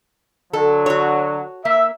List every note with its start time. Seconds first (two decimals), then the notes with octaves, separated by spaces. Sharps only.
0.53 D3 F#3 A4
0.86 F#4 C#5
1.65 A#3 E5